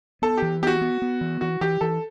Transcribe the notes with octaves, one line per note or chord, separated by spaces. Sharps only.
B3 A4
E3 G4
B3 F#4 G4
B3
B3
E3
E3 F#4
E3 G4
E3 A4